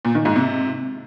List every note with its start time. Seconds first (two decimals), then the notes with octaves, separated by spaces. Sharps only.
0.05 A#2
0.15 D#3
0.25 G#2
0.36 C3